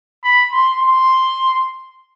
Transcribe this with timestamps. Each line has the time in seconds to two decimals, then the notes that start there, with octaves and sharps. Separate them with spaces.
0.24 B5
0.52 C6
0.81 C6